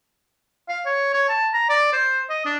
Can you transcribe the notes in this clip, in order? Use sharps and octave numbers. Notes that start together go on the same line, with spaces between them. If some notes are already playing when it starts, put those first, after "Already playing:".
F5
C#5
C#5
A5
A#5
D5
C5
D#5
D4